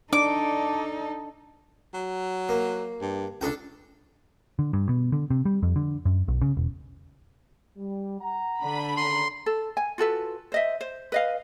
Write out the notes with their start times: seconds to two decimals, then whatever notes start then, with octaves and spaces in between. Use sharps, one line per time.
0.13 D4 D#4 A4 D6
1.94 F#3
2.49 A#3
3.01 G2
3.41 C#2 D4 A4 G5
4.59 D3
4.73 G2
4.89 B2
5.12 D3
5.30 C3
5.45 G3
5.63 F2
5.76 D3
6.05 F#2
6.28 B1
6.41 C#3
6.57 E1
7.77 G3
8.20 F#5 A#5
8.63 D3 D4 B5
8.97 D#2 C#3 A#5 C6
9.46 A4
9.77 G#5
9.98 F4 F#4 A4 B4
10.52 C5 D#5 E5
10.81 C5
11.12 B4 D#5 F5